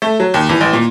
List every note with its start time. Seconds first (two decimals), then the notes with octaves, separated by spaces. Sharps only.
0.02 A3
0.20 F#3
0.34 D#2
0.49 E2
0.61 A1
0.73 A#2